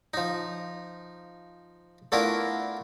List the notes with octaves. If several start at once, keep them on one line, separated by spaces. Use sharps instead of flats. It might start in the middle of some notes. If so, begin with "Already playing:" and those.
F3 D#4
A3 B3 D4 E4 F4 A#4